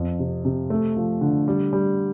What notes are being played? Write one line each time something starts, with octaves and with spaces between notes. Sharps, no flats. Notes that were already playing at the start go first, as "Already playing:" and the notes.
Already playing: F2
C3
C3
A3
F3
D3
G3
G3